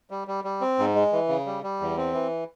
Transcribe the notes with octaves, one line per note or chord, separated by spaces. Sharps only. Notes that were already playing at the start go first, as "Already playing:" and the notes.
G3
G3
G3
C4
G#2
G#3
E3
C#3
G3
G3
E2
C4
E3